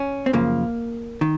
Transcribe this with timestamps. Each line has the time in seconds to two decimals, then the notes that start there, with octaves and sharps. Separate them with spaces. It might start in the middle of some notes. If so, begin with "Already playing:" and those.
Already playing: C#4
0.26 C4
0.33 F#2 C#3 F3 A#3
1.21 D#3